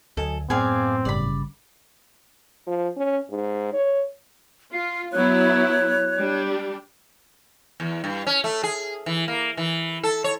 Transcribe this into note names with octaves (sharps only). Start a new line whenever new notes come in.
D2 F#3 A4 D#5 G#5
F#2 A2 B3 C4 G#4 D5 F5 G#6
G1 C#3 G3 D5 B5
F3
C#4
G#2
C#5
F4 C7
F#3 B3 E4 C#5 F#6
G3 D4 G4
E2
G2
C#4
A3
G#4
E3
A#3
E3
A4
C#5